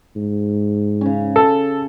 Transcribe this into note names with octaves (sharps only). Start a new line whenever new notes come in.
G#2
C#3 C#4
A4